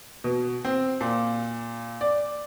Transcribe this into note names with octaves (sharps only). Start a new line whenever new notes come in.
B2
C4
A#2
D5